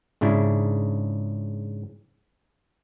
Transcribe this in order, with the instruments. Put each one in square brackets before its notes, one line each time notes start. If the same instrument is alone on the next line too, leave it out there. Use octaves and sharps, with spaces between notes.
[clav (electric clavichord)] G#2 C#3 D4 E4